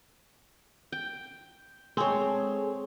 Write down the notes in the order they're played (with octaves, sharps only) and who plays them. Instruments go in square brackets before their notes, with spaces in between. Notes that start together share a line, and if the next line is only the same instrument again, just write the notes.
[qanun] G5
[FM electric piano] G#3 G#4 A4 [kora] C4 [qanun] C#5 C6